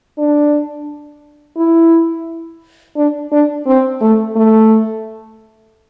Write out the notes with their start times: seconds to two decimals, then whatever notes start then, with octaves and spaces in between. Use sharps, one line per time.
0.18 D4
1.57 E4
2.97 D4
3.32 D4
3.66 C4
4.01 A3
4.36 A3